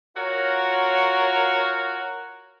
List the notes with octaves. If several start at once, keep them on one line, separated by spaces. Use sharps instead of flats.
F4 F#4 A#4 C#5